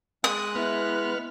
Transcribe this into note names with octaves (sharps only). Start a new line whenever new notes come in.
G#3 D#6 F#6
B3 E4 F6